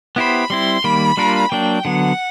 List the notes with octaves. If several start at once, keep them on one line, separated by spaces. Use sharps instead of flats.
B3 E4 G4 C5 B5
G3 C4 E4 C6
D#3 G3 A#3 B5
G3 A#3 D4 F4 A#4
F#3 A#3 D4 G5
D3 F#3 B3 F#5